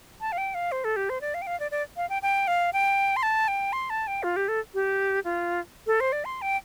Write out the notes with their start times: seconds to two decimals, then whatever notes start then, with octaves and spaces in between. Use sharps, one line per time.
0.21 A5
0.32 F5
0.38 G5
0.54 F5
0.72 C5
0.84 A4
0.96 G4
1.10 C5
1.21 D5
1.34 F5
1.42 G5
1.47 F5
1.60 D5
1.71 D5
1.97 F5
2.10 G5
2.22 G5
2.48 F5
2.73 G5
3.16 C6
3.23 A5
3.48 G5
3.73 C6
3.90 A5
4.07 G5
4.23 F4
4.36 G4
4.48 A4
4.74 G4
5.24 F4
5.87 A4
6.00 C5
6.12 D5
6.25 C6
6.42 G5